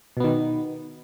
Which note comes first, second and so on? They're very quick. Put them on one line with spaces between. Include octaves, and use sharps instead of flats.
B2 B3 D#3